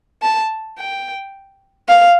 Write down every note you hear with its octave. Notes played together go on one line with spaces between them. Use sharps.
A5
G5
F5